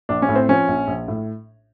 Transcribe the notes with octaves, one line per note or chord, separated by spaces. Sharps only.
A#1 D4
C#4
A2
C4
F3 C#4
A#1
A#1
A2